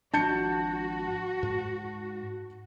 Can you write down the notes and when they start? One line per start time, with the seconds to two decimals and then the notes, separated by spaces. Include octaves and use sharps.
0.14 G#1 F3 D4 F#4 A5 G6 C#7
1.43 G#2